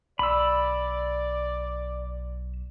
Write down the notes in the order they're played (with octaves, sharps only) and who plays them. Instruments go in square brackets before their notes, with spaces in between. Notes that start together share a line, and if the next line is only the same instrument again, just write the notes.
[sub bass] B1 [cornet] D5 [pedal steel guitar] B5 E6